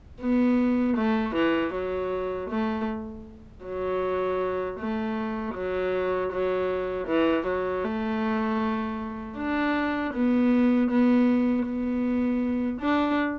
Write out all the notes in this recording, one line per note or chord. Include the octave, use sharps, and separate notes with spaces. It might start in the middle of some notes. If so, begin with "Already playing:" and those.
B3
A3
E3
F#3
A3
F#3
A3
F#3
F#3
E3
F#3
A3
D4
B3
B3
B3
D4